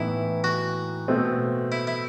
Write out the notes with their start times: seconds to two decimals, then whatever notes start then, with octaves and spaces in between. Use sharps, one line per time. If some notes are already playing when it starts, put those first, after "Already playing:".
Already playing: A2 E3 B3 D#4 E4
0.44 F#4
1.08 B2 A3 C4
1.72 E4
1.87 E4